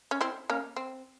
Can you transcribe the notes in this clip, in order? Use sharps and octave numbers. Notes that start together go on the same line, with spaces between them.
C#4
C4 E4
A#3 C#4
C4